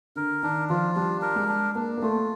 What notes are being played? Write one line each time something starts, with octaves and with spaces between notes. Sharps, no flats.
D3 A#4
D#3 D4
F3 F4
G3 D4
A#4
G#3
D4
A#3 D4
A#3
A3 F4